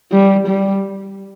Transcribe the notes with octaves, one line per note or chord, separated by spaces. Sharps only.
G3
G3